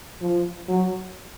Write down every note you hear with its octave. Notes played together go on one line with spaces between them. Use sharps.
F3
F#3